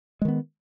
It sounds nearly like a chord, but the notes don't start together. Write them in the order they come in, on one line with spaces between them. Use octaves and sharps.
G#3 D#3 B3